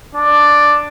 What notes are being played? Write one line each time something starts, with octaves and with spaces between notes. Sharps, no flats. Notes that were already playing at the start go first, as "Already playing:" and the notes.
D4